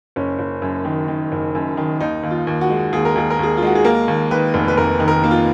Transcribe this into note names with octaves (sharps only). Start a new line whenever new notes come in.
F#1 C#4
F#1
F#2
D#3
D#3
F#1
F#2
D#3
D#2 D#4
D#2
F4
D#2
F#4
G#3
D#2 G#4
A#4
D#2 G#4
A#4
D#2 G#4
F4
G#3 F#4
G#4
A#3 A#4
D#2
D#3 B4
F1
B4
F1 A#4
D#3
A#4
A#3
F4